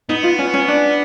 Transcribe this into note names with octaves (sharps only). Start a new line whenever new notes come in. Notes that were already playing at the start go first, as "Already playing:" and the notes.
B3 D#4
F4
C#4
C#4
D4